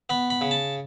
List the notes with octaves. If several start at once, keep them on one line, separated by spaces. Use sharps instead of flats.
B3 B5
B5
C#3
A5